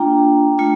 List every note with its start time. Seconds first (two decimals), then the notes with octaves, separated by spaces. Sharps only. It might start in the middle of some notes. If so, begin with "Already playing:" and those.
Already playing: A#3 D4 F4 G5 A#5
0.58 A3 D4 F4